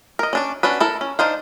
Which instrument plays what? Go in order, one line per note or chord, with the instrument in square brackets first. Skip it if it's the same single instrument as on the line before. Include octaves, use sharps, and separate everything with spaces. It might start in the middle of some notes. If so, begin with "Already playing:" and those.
[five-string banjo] A#4 D#5
C#4 D4 D5
C#4 D4 F#4 B4
E4 A4 A#4
C#4
D4 D#4 C5 F5